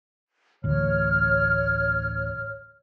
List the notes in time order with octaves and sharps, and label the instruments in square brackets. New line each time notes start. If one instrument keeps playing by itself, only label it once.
[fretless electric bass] A1 D2 [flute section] C#5 F6